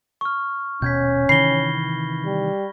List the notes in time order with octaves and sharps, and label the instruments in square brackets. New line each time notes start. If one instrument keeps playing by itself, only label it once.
[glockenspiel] C#6 F6
[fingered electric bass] D#1 B2 [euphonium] C#4 [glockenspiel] G6 G#6 B6
[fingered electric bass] C3 D#3 E3 [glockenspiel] B5 A#6 G7 [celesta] C7
[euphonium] G3